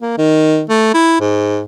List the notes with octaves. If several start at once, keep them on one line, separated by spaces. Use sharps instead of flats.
A#3
D#3
A3
E4
G#2